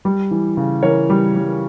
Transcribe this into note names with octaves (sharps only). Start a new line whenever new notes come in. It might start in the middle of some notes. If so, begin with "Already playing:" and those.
G3
E3
C#3
E3 A#4 C#5
G3
G3